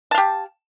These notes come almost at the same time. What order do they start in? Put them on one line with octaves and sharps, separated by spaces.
A5 F5 G4